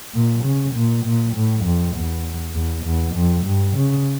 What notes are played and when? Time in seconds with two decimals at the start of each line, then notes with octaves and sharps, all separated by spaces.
0.14 A#2
0.44 C#3
0.74 A#2
1.04 A#2
1.35 A2
1.65 F2
1.95 E2
2.55 E2
2.85 E2
3.15 F2
3.45 G2
3.75 C#3